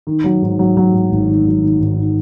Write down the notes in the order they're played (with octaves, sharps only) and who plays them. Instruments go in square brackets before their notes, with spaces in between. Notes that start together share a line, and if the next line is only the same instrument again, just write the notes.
[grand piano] D#3
F#3
G#2
F#3
F#3
G#2
G#1
D#3
F#3
D#3
G#1
D#3